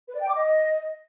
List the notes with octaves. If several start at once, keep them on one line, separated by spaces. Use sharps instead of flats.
B4
D5
G5
D6
D#5